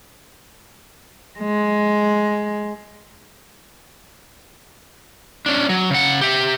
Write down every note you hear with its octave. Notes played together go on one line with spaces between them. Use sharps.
G#3
C#4 D4
F#3
C#3 F#5
G4 E5